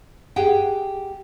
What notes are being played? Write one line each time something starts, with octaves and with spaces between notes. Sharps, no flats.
G4 G#4 F#5 G5